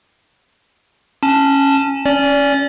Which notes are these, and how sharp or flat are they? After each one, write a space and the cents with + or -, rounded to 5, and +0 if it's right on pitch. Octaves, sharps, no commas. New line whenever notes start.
C#4 -10 A5 +0
C#4 +0 D5 -25